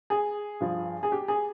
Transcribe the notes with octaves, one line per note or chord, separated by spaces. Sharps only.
G#4
G2 F3
G#4
G4
G#4